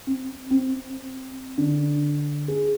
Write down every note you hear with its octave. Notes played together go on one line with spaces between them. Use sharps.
C4
C4
D3
G#4